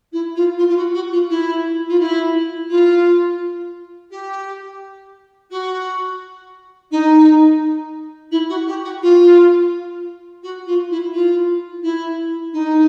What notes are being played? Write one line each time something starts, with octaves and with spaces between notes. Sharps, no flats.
E4
F4
F4
F4
F#4
F#4
F4
E4
F4
E4
F4
G4
F#4
D#4
E4
F#4
G4
F#4
F4
F#4
F4
E4
F4
E4
D#4